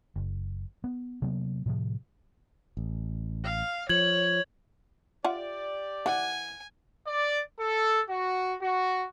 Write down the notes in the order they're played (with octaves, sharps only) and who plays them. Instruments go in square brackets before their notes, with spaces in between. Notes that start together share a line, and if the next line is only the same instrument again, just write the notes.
[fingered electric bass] F#1
B3
C3 F#3 A#3 B3
A2 C3 F3
A1
[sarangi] F5
[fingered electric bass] F3 [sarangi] C#5 [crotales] G#6 F#7
[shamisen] F4 E5 F#5 [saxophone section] G4 D5
[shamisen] E3 [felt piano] F#5 [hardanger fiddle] G#5
[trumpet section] D5
A4
F#4
F#4